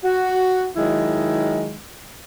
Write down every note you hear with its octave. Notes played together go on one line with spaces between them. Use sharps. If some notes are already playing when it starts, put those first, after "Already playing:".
F#4
D#3 F#3 G#3 E4